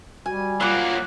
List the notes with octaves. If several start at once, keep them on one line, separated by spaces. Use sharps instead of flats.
G3 F#4 G#5
F#3 A#3 F4 F#5 D6